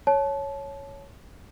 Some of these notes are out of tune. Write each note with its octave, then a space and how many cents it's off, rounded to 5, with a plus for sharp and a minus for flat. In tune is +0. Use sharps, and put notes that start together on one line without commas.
C#5 +0 A5 -25